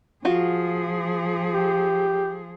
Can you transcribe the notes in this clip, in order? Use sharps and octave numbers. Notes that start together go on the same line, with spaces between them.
F3 F4 F#4 G#4
G4